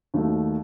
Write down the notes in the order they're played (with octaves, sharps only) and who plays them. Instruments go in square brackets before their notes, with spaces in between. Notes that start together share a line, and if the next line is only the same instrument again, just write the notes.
[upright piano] D#2 D#3 F#3 A3